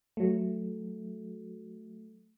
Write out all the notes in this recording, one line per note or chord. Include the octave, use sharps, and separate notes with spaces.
F#3 A3